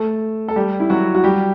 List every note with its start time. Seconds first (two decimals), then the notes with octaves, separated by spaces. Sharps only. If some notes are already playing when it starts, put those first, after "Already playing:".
Already playing: A3 A4
0.48 A4
0.56 G3 G4
0.80 E4
0.90 F#3 F#4
1.15 F#4
1.24 G3 G4